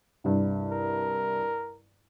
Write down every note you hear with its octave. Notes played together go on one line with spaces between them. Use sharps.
C2 G2
A#4